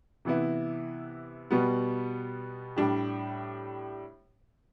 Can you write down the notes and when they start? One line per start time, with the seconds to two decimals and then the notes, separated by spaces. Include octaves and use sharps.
0.25 C3 E3 B3 E4
1.51 B2 G3 B3
2.76 A2 G3 D4 G4